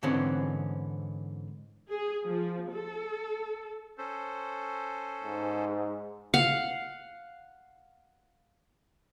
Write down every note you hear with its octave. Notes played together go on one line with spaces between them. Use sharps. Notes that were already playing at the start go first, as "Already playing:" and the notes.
G#2 D3 E3 C4 C#4
G#4
F3
A4
C#4 A4 C5
G#2
F5 F#5